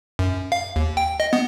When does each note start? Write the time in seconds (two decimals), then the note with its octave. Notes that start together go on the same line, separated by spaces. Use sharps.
0.19 F#2
0.52 F5
0.76 D#2
0.97 G5
1.20 D#5
1.33 B3